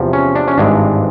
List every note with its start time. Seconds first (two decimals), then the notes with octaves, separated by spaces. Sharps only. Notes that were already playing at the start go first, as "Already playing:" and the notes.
Already playing: E2 C3 F3
0.13 C#4
0.35 D4
0.48 C#4
0.58 G#1 G2 E3 G#3 D4